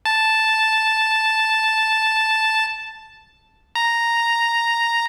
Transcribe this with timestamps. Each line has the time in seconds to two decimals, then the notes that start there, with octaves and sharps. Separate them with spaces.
0.05 A5
3.75 A#5